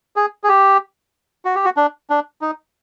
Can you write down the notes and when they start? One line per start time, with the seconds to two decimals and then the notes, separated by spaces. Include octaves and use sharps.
0.16 G#4
0.44 G#4
0.48 G4
1.45 F#4
1.55 G4
1.65 F#4
1.77 D4
2.10 D4
2.41 D#4